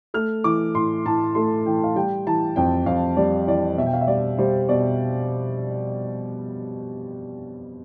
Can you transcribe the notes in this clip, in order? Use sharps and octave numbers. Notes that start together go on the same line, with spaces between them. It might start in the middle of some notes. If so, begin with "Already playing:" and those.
A3 F6
E3 D6
A2 C6
A2 A5
A3 C6
E3 G5
F5
G3 G5
E3 A5
F2 G5
F2 F5
G3 D5
E3 D5
B2 E5
G5
F5
E5
G3 D5
G3 C5
B2 D5